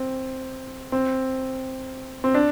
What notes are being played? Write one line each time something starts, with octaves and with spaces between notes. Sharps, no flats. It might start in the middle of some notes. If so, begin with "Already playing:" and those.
Already playing: C4
C4
C4
D4